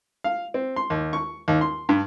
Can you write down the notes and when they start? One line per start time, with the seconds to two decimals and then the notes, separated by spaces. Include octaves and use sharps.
0.24 F5
0.54 C4
0.76 C6
0.90 D#2
1.13 C#6
1.48 D#2
1.61 C6
1.89 G2